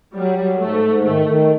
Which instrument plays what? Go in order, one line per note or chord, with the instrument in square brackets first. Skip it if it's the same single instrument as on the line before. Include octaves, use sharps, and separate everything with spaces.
[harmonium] F#3 [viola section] G3
[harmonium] F#3
[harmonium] G#2 [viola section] A3
[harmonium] G#2
[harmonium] D#3 [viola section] A3
[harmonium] D#3